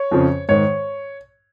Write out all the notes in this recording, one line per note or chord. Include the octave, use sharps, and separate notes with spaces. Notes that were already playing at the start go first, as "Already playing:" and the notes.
Already playing: C#5
F2 C#3 F3
G#2 D#3 C#5